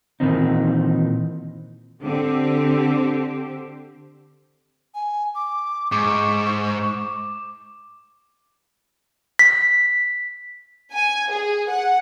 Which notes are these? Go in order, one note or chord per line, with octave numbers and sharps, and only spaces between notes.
A#2 D#3 E3 C4 D#4
D3 C4 G4
G#5
D6
G#2 C#6 D6
B6
G#5
G#4
F#5